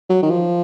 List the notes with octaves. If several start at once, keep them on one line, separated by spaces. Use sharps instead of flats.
F#3
D#3
F3